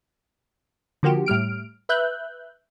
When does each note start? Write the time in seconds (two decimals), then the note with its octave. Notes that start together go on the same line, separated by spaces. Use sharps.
1.03 D3 F3 A#3 F#4 G4
1.26 A2 G3 F6 D7
1.89 B4 E5 F#6 G6